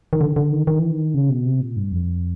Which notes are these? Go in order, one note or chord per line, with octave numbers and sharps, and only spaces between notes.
D#3
D3
D3
D#3
D#3
E3
D#3
C#3
B2
C3
A#2
G2
F2